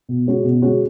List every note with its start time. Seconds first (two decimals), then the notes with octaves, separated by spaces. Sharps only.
0.09 B2
0.27 G#3 C#4 F#4
0.44 B2
0.62 G#3 C#4 F#4